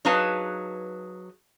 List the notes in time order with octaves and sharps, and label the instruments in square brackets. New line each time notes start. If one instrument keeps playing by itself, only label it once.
[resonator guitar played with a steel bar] F#3 D#4 G#4 B4 F5 A5